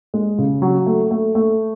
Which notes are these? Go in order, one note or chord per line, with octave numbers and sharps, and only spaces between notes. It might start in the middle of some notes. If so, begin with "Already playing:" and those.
G#3
C#3
F#3
A3
A3
A3